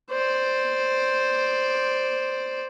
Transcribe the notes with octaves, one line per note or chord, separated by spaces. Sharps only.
C5 D5